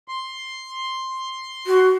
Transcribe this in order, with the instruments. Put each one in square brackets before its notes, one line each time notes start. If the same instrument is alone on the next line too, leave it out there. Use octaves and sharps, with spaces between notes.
[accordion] C6
[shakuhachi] F#4